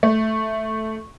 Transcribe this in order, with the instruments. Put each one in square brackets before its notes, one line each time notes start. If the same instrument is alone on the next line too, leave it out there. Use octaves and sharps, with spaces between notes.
[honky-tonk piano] A3